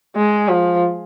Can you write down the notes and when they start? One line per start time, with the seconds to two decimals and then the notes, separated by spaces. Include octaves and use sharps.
0.16 G#3
0.48 F3